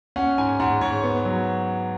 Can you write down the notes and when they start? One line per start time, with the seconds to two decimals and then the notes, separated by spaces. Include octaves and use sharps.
0.16 C#4 F#5
0.38 G#2 G#5
0.60 G#2 F#5
0.81 G#2 C#5
1.04 B3
1.25 F#3